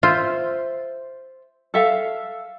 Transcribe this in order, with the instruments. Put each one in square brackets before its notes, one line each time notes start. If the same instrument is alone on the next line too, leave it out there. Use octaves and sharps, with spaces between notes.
[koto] F4 [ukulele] C5 E5
[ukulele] A4 E5 F5